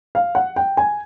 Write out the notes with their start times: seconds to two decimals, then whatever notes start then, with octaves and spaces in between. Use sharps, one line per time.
0.15 F5
0.35 F#5
0.56 G5
0.77 G#5